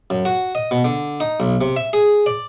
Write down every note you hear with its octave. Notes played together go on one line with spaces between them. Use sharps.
F#2
F#4
D#5
B2
D3
D#4
B1
C3
E5
G#4
D5